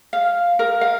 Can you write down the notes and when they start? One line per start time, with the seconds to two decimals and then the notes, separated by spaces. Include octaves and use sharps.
0.13 F5
0.59 A#4
0.81 F5